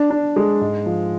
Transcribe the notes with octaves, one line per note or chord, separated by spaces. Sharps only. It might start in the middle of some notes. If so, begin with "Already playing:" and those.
Already playing: D4
D4
G#3
G#2
F3